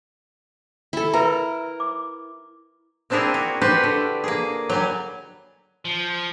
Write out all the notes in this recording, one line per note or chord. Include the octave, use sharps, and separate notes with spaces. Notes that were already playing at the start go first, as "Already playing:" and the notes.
E4 A4
A#4 B4 E5 A#5
D6
A#3 C4 D4 E4 G#4 A#4
F#4
F#4 G4 B4 C5 D5
D3
A#3 G#4
F#3 G3 G#5
F3